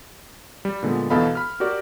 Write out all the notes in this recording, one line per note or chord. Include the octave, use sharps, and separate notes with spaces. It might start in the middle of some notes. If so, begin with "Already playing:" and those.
G3
A#2 D3 G#3 B3
E2 B2 A4 D#5 F5 B5
B5 F6
F#4 G4 A#4 D5